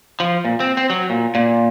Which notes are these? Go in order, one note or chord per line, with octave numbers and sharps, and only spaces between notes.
F3
A#2
C4
C4
F#3
A#2
A#2